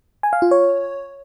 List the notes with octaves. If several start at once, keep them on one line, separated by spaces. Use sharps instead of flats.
G#5
F5
F4
C#5